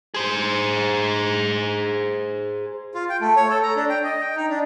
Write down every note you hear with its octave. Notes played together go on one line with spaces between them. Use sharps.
G#4 C5
F4
G5
A3
C#5
A4
A#5
D4
G5
D#5
G5
D#4
D4